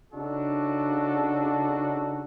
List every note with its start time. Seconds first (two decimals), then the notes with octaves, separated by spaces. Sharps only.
0.12 C#3 D4 D#4 F#4 A4